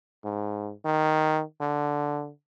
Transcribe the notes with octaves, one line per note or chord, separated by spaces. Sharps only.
G#2
D#3
D3